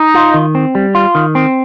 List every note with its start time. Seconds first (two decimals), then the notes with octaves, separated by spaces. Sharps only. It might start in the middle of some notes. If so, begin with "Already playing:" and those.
Already playing: D#4
0.14 F4
0.34 D#3
0.55 C4
0.75 G3
0.95 F4
1.15 D#3
1.35 C4